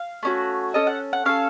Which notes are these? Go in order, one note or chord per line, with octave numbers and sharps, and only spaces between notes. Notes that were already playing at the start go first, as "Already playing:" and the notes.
Already playing: F5
A3 C#4 F#4
C#4 A4 D#5
F#5
F#5
C#4 A4 F5